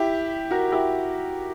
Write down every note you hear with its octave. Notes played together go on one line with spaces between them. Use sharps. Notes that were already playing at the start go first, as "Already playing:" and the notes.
Already playing: E4 G4
F#4 A#4
E4 G4